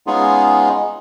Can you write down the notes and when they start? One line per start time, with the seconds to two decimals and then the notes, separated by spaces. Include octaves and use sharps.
0.07 G#3 B3 C#4 D#4 F4 G#4